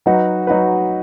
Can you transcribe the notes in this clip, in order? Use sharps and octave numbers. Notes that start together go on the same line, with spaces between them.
F#3 D#4 F#4 B4
F#3 D#4 F#4 B4